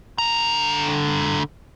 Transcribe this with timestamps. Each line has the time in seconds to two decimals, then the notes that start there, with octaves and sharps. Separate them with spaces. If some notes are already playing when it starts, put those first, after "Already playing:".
0.18 D3 A#5